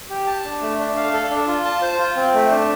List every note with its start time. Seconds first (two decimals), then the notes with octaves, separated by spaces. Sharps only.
0.10 G4
0.26 A5
0.45 D4
0.61 A3
0.79 D4
0.96 F5
1.13 A4
1.31 D4
1.48 F4
1.64 A5
1.82 C5
1.99 F4
2.16 C4
2.34 A3
2.50 D4